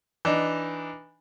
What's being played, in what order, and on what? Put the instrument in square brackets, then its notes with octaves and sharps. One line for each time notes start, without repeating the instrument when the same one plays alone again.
[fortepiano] E3 D4 D#4